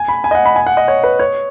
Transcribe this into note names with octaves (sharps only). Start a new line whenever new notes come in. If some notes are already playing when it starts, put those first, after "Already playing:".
Already playing: G#5
B5
G#5
D#5
F#5
B5
G#5
F#5
D#5
C#5
B4
C#5